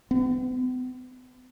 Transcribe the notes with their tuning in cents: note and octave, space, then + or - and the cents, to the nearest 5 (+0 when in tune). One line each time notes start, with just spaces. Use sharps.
B3 +45